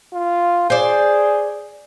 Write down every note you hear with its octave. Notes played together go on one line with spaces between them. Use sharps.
F4
G#4 C5 D5